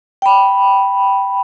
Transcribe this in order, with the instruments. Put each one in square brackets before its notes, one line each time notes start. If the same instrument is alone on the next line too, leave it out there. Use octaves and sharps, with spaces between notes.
[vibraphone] G5 B5